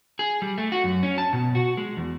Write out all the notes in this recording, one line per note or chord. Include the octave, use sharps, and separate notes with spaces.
G#4
G3
A3
F#4
F#2
C#4
A5
B2
F#4
G#3
E2